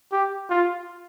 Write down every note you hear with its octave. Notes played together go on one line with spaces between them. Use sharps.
G4
F4